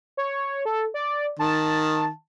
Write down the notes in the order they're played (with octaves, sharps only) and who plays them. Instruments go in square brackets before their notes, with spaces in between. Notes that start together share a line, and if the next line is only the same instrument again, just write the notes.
[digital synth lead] C#5
A4
D5
[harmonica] D#3 [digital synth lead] A5